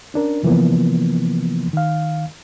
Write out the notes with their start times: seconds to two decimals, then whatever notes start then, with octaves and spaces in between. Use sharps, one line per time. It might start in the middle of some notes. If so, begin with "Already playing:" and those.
0.14 C#4 D4 A#4
0.43 C3 E3 F3 A#3 B3
1.73 D#3 F5